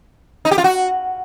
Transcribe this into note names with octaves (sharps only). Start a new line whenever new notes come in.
D#4
G4
F4
F#4